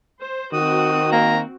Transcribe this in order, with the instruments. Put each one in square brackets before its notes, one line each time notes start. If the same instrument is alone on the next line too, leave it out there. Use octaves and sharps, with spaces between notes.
[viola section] C5
[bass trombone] D#3 [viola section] C4 F#4 [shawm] D#6
[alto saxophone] A#3 [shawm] A#5